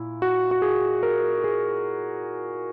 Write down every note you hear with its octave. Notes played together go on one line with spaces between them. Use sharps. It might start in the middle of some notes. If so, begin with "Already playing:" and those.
Already playing: A#2 E4
F#4
F#4
G#4
A#4
G#4